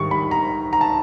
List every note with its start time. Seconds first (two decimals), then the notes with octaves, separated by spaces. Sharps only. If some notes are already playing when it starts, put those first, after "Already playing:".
Already playing: G#2 D#3 G3 C#6
0.11 B5
0.31 A#5
0.73 A#5
0.81 A5